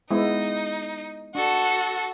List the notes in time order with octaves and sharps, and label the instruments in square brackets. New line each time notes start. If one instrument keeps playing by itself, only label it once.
[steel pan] G#3 B3 E4 [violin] D#4
[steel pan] D4 [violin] F#4 A4